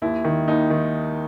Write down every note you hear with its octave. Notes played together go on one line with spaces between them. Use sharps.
D#2 E4
D#3
D#2 D#4
D#3